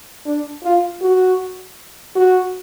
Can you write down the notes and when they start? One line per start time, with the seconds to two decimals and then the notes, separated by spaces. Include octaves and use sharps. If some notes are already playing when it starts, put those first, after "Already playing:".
0.26 D4
0.64 F4
1.02 F#4
2.15 F#4